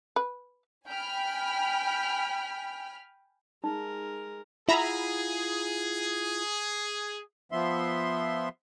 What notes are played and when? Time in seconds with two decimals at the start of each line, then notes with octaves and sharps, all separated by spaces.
0.16 B4
0.87 G5 G#5 B5 F6 B6
3.64 G#3 D#4 A#4
4.69 E4 F4 G#4 E5 F#5 A#5 B5
7.52 F3 B3 E5 C6